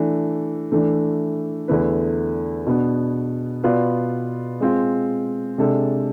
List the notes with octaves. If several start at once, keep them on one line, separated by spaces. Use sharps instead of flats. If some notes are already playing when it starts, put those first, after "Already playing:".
Already playing: E3 A3 D4
E3 A3 D4
E2 D3 A3 E4 B4
B2 B3 D4
B2 B3 F4 B4 D5
G#3 C4 F4
C3 G#3 D4 A4